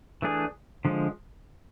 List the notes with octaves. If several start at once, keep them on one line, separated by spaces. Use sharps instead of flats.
E3 A3 D4 G#4
D3 F3 G#3